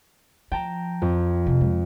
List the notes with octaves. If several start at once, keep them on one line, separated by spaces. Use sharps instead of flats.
F3 G5 A5 A#5
F2
C3 D#3
G#3